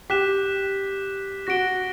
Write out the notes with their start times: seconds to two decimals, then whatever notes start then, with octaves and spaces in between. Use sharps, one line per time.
0.10 G4 F#6 B6 E7
1.47 F#4 A#6 D7 G7